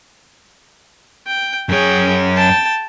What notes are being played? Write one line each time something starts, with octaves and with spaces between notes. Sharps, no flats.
G5
F#2 G#4 C#5 G5
G5 A5